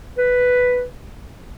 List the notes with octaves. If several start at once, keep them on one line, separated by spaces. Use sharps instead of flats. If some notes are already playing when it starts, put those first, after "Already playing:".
B4